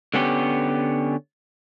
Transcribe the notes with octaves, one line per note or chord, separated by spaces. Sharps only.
D3 B3 C#4 G4